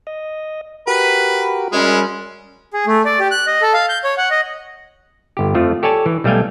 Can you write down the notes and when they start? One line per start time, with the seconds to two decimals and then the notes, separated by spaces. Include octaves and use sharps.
0.07 D#5
0.87 F#4 G4 A#4 B4
1.72 F#2 G3 G#3 C#4
2.74 G#4
2.87 A3
3.05 D5
3.19 G4
3.31 F#6
3.47 D#5
3.62 A4
3.74 F5
3.89 G6
4.04 C#5
4.17 F#5
4.31 D#5
5.37 G1 G4
5.55 F2 F3 A3 F4
5.83 G4 A4 C#5 D5 G#5 A5
6.06 E3
6.24 B1 G3 A3 F5 G5 G#5